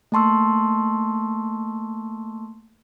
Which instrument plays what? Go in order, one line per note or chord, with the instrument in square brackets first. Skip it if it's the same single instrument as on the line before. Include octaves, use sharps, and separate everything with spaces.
[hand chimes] A3 A#3 A5 C6 C#6 E6